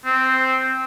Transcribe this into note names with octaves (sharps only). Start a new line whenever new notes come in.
C4